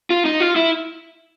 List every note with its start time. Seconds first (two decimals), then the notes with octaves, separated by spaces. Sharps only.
0.10 F4
0.25 D#4
0.40 F4
0.56 E4